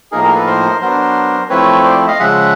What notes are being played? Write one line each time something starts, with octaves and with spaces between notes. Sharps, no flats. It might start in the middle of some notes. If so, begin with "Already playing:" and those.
A2 F3 A#3 D#4 G#4 A#4
G#4 A#4
A4 B4
A#4 C5
F#3 B3 D4 A#4 C5
F3 A3 C4 E4 B4 C#5
C5 D5
D#5 F5
C#3 F3 G#3 E5 F#5